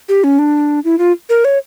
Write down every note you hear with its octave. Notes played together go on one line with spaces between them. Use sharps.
G4
C#4
D4
E4
F4
A#4
C#5